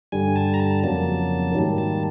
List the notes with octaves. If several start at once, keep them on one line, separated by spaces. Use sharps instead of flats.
G2 D3 G3 G#5
A5
A#5
A5
F2 C#3 F#3 A#3 A5
G#2 D#3 G3 A#3
A5